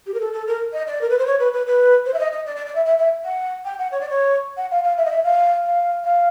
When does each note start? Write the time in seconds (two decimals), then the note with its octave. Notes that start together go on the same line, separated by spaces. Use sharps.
0.06 G4
0.14 A#4
0.20 A4
0.33 A4
0.47 A#4
0.73 D#5
0.87 D5
1.01 A#4
1.09 B4
1.18 C5
1.26 C#5
1.39 B4
1.53 B4
1.66 B4
2.06 C5
2.13 E5
2.19 D#5
2.32 D#5
2.46 D5
2.56 D5
2.66 D5
2.75 E5
2.85 E5
2.98 E5
3.25 F#5
3.65 G5
3.79 F#5
3.91 C#5
4.00 D5
4.09 C#5
4.57 F#5
4.71 F5
4.83 F5
4.97 E5
5.05 D#5
5.11 E5
5.24 F5
5.63 F5
6.04 F5